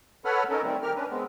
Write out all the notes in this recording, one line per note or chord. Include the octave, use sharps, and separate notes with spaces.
A4 B4 C#5 F#5 B5 F6
C#4 D#4 A4 A#4
D#3 G3 A3 C4
G4 A#4 F6
C#4 D4 B4
G#3 B3 C4